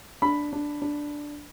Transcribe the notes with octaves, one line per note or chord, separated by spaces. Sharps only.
D4 B5
D4
D4